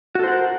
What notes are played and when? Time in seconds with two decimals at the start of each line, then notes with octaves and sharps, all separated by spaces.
0.15 F#4
0.19 A4
0.24 C5
0.28 F#5
0.32 A#4